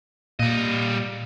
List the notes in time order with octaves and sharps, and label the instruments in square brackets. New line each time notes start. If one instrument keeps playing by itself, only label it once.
[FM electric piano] A#2 [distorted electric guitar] G3 D#5